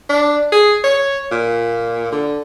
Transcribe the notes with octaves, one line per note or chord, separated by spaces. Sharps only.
D4
G#4
C#5
A#2
D3